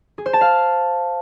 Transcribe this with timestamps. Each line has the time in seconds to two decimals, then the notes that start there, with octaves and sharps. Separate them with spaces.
0.18 G#4
0.26 C5
0.33 A5
0.41 F5